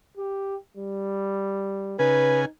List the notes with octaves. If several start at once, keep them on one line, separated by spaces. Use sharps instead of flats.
G4
G3
C#3 D#4 B4 G#5